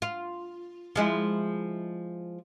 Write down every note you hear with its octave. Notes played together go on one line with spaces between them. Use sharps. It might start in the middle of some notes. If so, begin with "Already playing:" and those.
F4
F3 G#3 E4